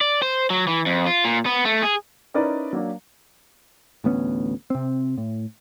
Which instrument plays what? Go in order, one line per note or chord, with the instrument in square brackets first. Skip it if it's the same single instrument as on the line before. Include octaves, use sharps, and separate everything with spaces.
[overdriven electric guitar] D5
C5
F#3
E3
F2
F4
A#2
B3
A3
G#4
[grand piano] C#4 D#4 E4 A#4 B4 D5
F#3 A#3 D4
[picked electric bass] A1 D2 B3 C#4
C3 C4
A2